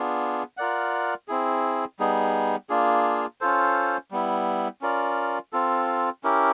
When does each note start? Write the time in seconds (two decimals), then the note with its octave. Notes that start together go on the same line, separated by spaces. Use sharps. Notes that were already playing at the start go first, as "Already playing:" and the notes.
Already playing: B3 D4 F4 G#4
0.57 F4 A#4 D5 F#5
1.28 C4 E4 G#4
1.99 G3 B3 D#4 G#4
2.69 A#3 D4 F4 G#4
3.41 C#4 F4 A4 C5
4.11 G3 B3 E4
4.81 C#4 F4 A#4 D5
5.53 C4 F4 A4
6.23 C#4 E4 G4 A#4